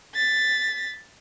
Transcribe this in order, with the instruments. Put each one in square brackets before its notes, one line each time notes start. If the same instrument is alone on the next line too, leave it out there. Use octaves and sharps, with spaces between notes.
[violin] A6 B6